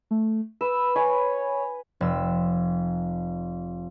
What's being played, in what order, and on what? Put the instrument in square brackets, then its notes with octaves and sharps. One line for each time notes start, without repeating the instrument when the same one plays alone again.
[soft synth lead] A3
[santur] B4 [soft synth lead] E6
[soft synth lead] C#5 [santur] G#5 B5
[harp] F1 E6